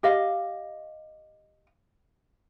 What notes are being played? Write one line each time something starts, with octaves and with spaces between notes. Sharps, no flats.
G4 D#5 F5